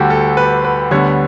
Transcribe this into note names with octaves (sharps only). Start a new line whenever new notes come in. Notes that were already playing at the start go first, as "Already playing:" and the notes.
Already playing: D2 D3 G3 F#4 G4 A4
A4
B4
B4
D2 D3 G3 B3 C#5